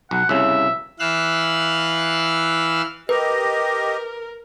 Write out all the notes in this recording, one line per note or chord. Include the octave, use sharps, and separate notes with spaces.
B1 F#5
C2 C#3 E5
E3 F5 E6 F#6
G4 A#4 B4 D#5